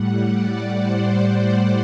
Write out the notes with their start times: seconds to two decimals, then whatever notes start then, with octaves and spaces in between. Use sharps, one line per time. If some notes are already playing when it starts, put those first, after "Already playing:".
Already playing: A2 G3 F#5
0.26 D5
0.72 C5